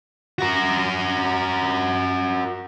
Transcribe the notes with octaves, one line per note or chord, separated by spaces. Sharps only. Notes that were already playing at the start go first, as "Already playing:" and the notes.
F#4 A#4